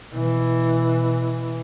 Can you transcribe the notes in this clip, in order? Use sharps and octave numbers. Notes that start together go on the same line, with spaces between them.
B2 E3